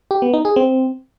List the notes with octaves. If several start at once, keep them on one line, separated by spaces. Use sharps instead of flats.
G4
B3
D#4
G#4
C4